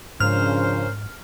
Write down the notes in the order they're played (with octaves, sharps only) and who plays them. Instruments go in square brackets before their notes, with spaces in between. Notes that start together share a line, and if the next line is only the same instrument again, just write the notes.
[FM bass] G#2 [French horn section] C#3 F3 D4 [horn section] C#4 A#4 C5 [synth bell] F6